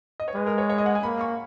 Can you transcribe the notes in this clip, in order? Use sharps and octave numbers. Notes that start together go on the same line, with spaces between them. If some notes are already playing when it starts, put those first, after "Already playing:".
D#5
C#5
G#3 B4
A#4
C#5
C#5
D#5
F#5
G#5
A#3 B5
C#6